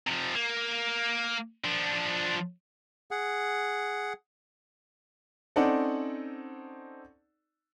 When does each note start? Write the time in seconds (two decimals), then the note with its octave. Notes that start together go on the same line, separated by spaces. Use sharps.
0.07 C3 F3
0.34 A#3
1.64 F3 D4
3.11 G#4 F#5
5.56 C4 C#4 D#4 A4 D5 F#5